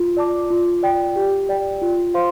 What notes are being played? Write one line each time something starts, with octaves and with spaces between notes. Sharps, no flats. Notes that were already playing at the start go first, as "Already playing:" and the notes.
Already playing: F4
D5 A5 D6
F4
D5 G5
G4
D5 G5
F4
C5 F5 C6